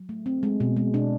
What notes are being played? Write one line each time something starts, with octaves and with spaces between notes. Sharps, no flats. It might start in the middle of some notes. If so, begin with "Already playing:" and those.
Already playing: F#3
A3
C4
G#3
B2
G#3
B2 D4